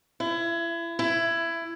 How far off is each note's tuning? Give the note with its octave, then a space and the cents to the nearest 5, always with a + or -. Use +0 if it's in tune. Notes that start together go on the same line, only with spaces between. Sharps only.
E4 +30
E4 +20